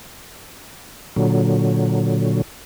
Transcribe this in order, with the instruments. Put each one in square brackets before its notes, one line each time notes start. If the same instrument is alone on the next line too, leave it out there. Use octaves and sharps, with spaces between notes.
[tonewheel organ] A#2 D3 F#3